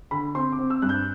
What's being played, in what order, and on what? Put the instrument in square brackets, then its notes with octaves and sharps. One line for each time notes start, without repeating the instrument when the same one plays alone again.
[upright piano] D3 B5
C4 C6
D6
C4
E6
G2 F#6
G6